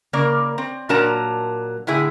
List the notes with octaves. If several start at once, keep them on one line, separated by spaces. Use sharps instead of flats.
C#3 A#3 A#4 D5
C4
A#2 F#3 D4 A#4 A5 A#5
A2 D3 E4 G#4